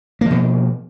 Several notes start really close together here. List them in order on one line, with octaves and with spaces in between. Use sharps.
A#3 F3 B2